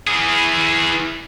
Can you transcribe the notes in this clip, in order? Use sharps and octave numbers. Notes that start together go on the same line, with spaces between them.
E3 G#4